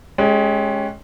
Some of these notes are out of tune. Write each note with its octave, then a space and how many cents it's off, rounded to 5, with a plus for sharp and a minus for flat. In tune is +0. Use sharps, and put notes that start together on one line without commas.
G#3 +20 C#4 +0 G4 +0